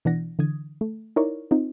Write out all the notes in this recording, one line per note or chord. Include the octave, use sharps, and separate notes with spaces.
B2 E3 D4 F#5 A#6
D3 E3 D#6 G#6
A3
D#4 E4 A#4 C#5 D5 C#6
C4 D#4 F4